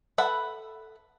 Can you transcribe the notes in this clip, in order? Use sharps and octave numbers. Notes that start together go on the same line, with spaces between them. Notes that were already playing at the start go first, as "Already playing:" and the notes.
A4 B4 E5 F#5 B5